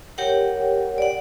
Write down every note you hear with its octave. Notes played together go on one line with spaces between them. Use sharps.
G4 A#4 C#5 F#5 G5
D5 F#5